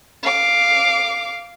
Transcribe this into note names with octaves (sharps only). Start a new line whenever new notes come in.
F5 D6